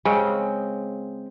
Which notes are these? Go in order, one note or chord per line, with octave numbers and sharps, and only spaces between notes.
C#3 G#3 C4